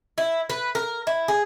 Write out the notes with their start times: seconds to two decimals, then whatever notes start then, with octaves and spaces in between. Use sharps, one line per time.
0.18 E4
0.50 B4
0.75 A#4
1.07 E4
1.28 G#4